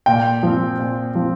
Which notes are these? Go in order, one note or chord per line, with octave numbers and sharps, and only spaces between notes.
A#2 G5
F3 C4
A#2
F3 C4